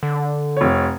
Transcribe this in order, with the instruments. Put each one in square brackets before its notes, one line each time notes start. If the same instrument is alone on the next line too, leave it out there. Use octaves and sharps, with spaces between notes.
[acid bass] D3
[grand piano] F1 C#5